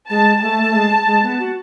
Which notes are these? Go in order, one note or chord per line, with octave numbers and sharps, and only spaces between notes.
G#3 A5
A3 A5
A3
G#3
G#3
B3
F#4